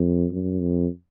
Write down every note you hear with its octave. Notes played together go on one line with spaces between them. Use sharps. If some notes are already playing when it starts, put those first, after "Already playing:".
Already playing: F2
F#2
F2